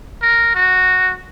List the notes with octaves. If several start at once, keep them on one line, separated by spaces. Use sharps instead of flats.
A#4
F#4